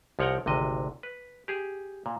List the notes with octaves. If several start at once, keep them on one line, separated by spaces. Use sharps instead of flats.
C2 F3 C#5 F#5 G5 A#5
G#1 D2 C3 D#5
B4
G4 G#4
A#2